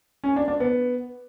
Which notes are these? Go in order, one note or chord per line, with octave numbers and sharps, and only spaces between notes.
C#4
D4
D4
B3